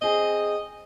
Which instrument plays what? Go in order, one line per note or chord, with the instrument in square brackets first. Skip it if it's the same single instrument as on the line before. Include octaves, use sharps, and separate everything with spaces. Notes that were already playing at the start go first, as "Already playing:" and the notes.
[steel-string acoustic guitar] C4 G#4 [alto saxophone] D#5